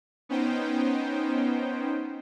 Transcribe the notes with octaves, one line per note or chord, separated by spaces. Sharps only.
B3 C#4 D#4 C5 G5